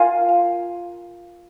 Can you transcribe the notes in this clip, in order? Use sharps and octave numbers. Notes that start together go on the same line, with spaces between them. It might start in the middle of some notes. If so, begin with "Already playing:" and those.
Already playing: F4 A#4 F5 G#5